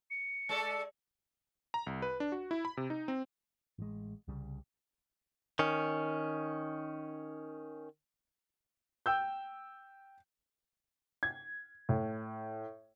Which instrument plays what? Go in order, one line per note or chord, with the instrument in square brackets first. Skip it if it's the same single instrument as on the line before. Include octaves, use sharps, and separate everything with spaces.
[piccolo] C#7
[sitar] G#3 A4 D5
[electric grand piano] A#5
C2
B4
D4
F#4
E4
B5
C3
D#4
C4
[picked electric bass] A1 G#3
C2 C#3 G3
[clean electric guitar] D#3 C#4
[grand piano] G5 E6 G6
[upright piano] G#6
A2